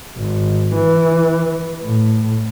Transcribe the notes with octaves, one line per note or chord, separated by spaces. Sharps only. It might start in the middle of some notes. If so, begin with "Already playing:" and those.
G#1
E3
A2